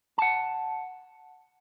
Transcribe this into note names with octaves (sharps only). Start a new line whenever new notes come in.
F#5 A5